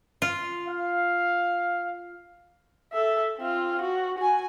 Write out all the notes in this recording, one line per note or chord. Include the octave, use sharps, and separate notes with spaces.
F4
F5
A4 E5
C4 F4
F#4
F#4 G#5